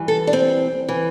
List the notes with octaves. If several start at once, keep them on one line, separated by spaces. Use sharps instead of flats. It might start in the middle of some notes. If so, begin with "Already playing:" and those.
Already playing: G2 E3
A4
D4
C4
E3